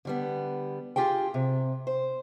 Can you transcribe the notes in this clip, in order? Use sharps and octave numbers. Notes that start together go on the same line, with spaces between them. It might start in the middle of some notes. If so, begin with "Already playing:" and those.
D3 G3 B3
F4 G4 G#4 G5
C3
C5